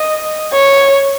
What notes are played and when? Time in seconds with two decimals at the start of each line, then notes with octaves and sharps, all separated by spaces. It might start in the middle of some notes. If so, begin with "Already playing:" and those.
Already playing: D#5
0.53 C#5